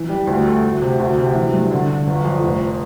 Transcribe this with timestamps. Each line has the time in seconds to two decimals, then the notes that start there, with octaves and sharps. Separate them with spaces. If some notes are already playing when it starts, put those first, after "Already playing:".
Already playing: E3
0.09 G3
0.27 D2
0.46 A3
0.63 D2
0.82 C3
0.99 D2
1.18 C3
1.35 E3
1.54 G2
1.71 D3
1.89 D3
2.07 G1
2.25 F2
2.43 F1